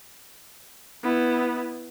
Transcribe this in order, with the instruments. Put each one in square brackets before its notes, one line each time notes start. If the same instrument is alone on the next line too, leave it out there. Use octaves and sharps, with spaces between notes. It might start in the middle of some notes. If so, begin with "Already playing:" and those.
[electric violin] B3 E4